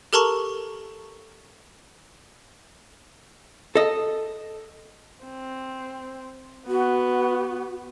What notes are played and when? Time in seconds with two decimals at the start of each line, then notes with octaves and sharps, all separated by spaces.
0.13 G4 A4 A#4 A5 A#5 C#6
3.75 A4 D#5
5.25 C4
6.68 B3 F#4